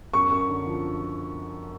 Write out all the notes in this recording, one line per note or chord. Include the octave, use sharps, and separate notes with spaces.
F#2 C#6
F#2
D3
F3